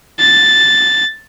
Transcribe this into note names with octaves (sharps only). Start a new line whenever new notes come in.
A6